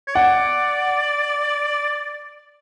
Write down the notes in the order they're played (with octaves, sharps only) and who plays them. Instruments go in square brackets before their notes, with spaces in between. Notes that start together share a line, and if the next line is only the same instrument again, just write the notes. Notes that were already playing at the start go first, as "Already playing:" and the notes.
[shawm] C#5
[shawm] D5 [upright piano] F#5